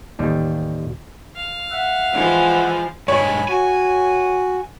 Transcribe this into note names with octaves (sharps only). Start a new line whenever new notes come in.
A1 D#2 G3
F5
E5 F#5
E3 F3 G#3
G2 G#3 C#5 G#5 B5
F#4 G#5